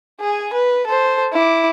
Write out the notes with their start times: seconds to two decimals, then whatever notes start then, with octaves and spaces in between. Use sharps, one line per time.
0.20 G#4 G#5
0.53 B4
0.87 A4 C5
1.33 E4 D6